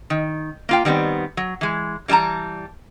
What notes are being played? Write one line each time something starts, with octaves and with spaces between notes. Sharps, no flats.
D#3
A#3 F4 G5
D#3 G3 B3 C4
F#3
E3 G#3
E3 G3 G#4 A5 A#5